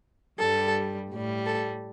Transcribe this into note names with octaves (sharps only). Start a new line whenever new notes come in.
G2 G3 A4
A2 G3
A4